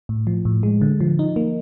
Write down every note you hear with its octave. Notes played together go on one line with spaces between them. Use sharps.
A2
F3
A2
G#3
D3
F3
D#4
A#3